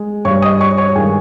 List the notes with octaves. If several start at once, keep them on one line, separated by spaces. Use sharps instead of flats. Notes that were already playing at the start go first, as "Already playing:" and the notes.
Already playing: G#3
G2 G3 C#5 C#6
D#5 D#6
C#5 C#6
C#5 C#6
G2 D#3 G#3 G#4 G#5